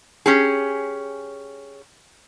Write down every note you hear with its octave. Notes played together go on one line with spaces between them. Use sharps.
C#4 G4 G#4